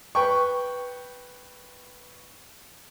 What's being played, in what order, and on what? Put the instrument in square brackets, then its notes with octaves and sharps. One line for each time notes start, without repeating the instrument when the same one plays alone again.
[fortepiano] B4 G5 C#6